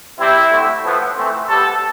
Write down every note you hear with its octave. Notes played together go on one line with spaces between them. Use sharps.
C3 G3 C4 E4
D3 A3 C4
A2 F3 B3
E3 A3 C4
C3 G3 B3 A4